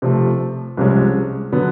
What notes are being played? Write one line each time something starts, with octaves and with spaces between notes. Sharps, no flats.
C3 F3 A3
C2 C3 F3 G#3 C#4
D3 F#3 B3